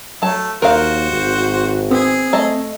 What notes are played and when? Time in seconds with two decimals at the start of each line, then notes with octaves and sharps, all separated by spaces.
0.22 F#3 A3 A5
0.62 D#2 F#4 A#4 C5 F5
1.12 G#1
1.91 B3 C4 G#4
2.33 A3 D#5